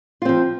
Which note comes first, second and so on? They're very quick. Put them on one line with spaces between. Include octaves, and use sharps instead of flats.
F4 C4 F3